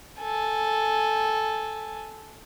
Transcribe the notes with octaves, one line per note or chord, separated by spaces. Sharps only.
A4 G#5